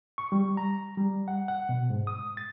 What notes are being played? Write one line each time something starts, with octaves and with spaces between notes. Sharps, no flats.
C#6
G3
A#5
G3
F#5
F#5
B2
G#2
D#6
A6